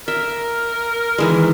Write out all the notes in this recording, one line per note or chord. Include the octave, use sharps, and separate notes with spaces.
A#4 E5
D#3 E3 G#3